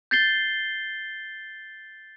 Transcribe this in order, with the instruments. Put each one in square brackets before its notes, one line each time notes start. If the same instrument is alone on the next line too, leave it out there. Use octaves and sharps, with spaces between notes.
[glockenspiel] G6 A6 C7 G7